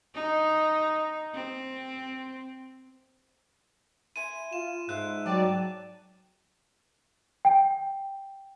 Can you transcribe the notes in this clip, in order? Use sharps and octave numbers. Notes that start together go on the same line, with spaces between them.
D#4
C4
E4 C5 G#5 D#7
F4 E7
G#2 E4 A4 C5 F#6
F#3 D5 G5 A5
G5